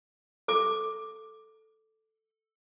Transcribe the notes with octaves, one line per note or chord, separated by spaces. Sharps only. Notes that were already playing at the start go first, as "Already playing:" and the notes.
A4 D6